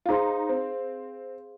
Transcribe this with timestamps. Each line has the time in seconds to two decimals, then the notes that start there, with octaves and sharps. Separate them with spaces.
0.06 F4
0.09 D#4 G#4 C5 F5 C6
0.49 C4